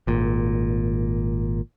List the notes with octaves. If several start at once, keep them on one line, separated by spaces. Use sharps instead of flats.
G#1 A#2